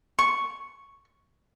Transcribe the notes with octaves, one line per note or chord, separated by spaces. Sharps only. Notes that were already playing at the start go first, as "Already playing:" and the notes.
C#6